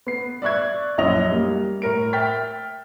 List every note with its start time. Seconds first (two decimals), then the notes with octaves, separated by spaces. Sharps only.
0.07 B3 C7
0.42 D5 E5 C#6 F#6 G#6
0.98 A#1 F#2 E4 C#5 D#5 F7
1.31 G3 A#3
1.82 A2 A#4 D7
2.13 E5 G5 F6 A6 B6